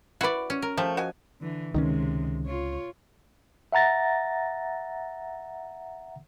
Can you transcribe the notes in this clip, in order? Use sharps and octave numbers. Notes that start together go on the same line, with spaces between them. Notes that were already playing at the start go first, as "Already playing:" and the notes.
E4 F#4 B4 D5
C#4
A#4
F3 A3 G4
F#4 D#5 G#5
D3 E3
C#2 C3 D#3 F3 G#3 C#4
F4 C#5
E5 F#5 A#5 A6 A#6